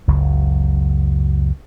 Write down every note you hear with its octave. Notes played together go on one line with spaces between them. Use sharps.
F#1 C#2 F#3